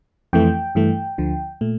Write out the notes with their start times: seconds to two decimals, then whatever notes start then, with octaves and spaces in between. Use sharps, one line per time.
0.33 F2 E3 A3 G5
0.75 G2 E3 A3
1.18 D2 D3 F3
1.61 A#2 A3